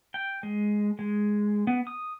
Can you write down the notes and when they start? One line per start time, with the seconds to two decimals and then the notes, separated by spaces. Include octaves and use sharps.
0.14 G5
0.43 G#3
0.99 G#3
1.67 B3
1.87 D#6